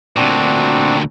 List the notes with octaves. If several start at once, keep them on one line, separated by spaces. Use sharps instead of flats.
D2 A#2 C4 D4 F#4